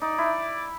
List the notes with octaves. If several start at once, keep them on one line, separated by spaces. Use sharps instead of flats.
D#4 D5
E4